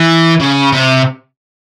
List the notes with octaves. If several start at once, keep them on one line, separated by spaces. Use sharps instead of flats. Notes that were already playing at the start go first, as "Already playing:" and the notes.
Already playing: E3
C#3
C3